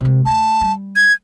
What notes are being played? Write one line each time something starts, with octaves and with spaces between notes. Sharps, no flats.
C3 G#3
D2 A5
G3
G#6